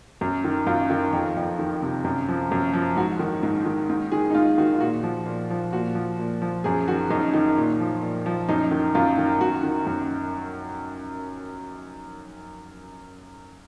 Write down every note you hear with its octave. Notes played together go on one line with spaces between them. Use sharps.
F#2
D#3
F#2 F4
D#3
F2
F2
D#3
C3
F#2
F3
F#2
F3
G#2 F#4
D#3
G#2
D#3
G#2
D#3 G#4
D#4
G#2 F4
D#3 F#4
F4
A#2 F#4
F3
A#2
F3
A#2 F#4
F3
A#2
F3
F#2 G#4
D#3 F#4
F#2 D#4
D#3 D#4
A#2
F3
A#2
F3
F#2 D#4
D#3
F#2 F4
D#3
F#2 F#4
D#3
F#2